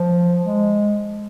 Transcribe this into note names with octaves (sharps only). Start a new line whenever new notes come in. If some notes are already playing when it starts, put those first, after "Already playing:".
Already playing: F3
G#3